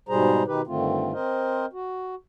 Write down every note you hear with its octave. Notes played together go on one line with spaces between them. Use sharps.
G#2 B2 G3 G#4 C5 A#5
B2 D#3 D#4 G4 B4
G2 D3 D#3 A3 C4 F4
C4 A#4 C5 D#5
F#4